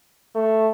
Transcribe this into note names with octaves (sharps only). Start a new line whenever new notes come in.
A3